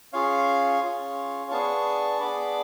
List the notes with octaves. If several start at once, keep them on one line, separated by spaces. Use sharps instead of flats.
C#4 F4 G#4 C#5 F5
C#4 F4 G#4
B3 D4 G#4 A5 C#6
B3 D4 G#4 B5 D6